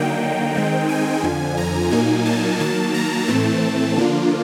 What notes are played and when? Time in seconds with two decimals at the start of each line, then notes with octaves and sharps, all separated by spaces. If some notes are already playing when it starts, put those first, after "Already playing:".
Already playing: D3 F#3 A#3 D#4 G5
0.55 D#3 G#3 C4 D#4
0.89 G#5
1.23 F2 D3 F3
1.57 A#5
1.91 A#2 F#3 A#3 D#4 G#5
2.25 A5
2.60 D#3 F#3 A#3 A5
2.94 A#5
3.27 A2 E3 A3 C4 A5
3.96 D3 F3 A#3 D4 F4